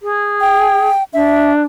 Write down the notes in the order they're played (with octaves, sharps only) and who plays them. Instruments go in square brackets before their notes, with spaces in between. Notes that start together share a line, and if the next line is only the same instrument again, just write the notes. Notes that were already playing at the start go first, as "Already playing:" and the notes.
[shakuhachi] G#4
[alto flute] G5
[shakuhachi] D4 [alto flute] E5